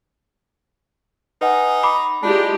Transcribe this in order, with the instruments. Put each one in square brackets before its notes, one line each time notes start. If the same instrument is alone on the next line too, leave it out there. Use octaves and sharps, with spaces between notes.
[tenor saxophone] D#4 [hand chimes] B4 F#5 G#5
[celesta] B5 D6 [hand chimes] C7
[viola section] G#3 G4 [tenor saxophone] D4 [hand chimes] E4 F4 A5